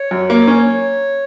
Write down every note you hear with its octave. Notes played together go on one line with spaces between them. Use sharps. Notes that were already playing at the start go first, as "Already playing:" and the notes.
Already playing: C#5
F#2
A#3
C#4